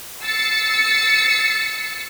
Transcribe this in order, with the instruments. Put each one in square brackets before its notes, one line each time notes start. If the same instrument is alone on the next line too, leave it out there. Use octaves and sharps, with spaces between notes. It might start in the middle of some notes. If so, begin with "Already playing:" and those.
[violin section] E6 A6 C7 C#7